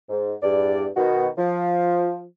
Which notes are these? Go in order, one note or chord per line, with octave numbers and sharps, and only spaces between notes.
G#2
E2 G2 D5
B2 D#3 F#4
F3